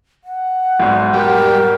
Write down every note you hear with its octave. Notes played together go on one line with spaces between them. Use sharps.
F#5
B1 G#2 D5
G3 A#4